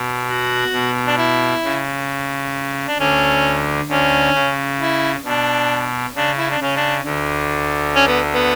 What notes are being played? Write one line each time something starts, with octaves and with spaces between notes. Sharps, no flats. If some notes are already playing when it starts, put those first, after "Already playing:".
Already playing: B2
F#4
B2
D4
E4
C#3
D4
D2 D3 C#4
D2 D3 C#4
C#3
E4
B2 D4
C#3 D4
E4
D4
C#3 C#4
D4
D2 D3
C#4
B3
B3